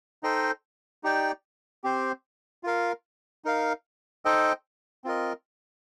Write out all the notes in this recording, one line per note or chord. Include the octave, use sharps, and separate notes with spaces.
D#4 A4 C5 D#5 G5
D#4 G4 D5 G5
C4 G4 C5
F4 A#4 F5
D#4 A#4 F5
D#4 A4 C5 D#5 G5
C4 F4 A#4 D#5